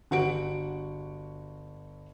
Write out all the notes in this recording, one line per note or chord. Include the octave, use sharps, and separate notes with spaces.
G1 F#4 F#5 D7